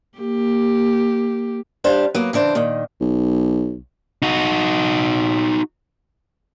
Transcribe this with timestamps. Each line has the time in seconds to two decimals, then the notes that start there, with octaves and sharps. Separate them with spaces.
0.18 A#3 G4
1.84 G3 D4 C5 F5
2.15 F#3 A#3 B3
2.33 C#3 E3 D4 C5
2.55 A#2 D#3
3.00 B1
4.22 D#4 F#4